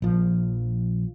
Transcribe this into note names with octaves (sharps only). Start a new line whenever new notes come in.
A#1 F3